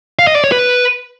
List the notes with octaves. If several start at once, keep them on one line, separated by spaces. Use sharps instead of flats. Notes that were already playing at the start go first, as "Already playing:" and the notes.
F5
D#5
D5
C#5
B4